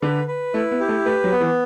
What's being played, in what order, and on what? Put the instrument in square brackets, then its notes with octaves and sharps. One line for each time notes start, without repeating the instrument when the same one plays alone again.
[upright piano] D3 [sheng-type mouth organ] B4
[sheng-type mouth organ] B4
[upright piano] A3 [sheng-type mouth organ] E4
[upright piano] B3
[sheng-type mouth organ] G4
[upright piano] A3
[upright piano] A3 [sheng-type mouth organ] B4
[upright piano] F#3
[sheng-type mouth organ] B3
[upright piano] E3